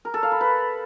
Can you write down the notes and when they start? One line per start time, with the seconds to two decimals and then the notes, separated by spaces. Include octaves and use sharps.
0.05 A#4
0.14 A4
0.23 F5
0.32 B5
0.41 B4